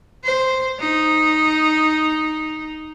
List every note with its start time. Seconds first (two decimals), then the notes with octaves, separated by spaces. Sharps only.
0.24 C5
0.80 D#4